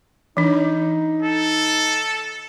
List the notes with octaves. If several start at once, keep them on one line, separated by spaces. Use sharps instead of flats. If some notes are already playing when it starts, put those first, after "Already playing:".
E3 D4 D#4
A4